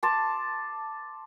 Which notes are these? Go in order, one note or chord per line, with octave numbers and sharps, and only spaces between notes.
A5 C6 D6